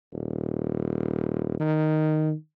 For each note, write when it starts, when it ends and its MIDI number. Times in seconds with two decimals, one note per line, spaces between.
0.12 1.56 27
1.60 2.33 51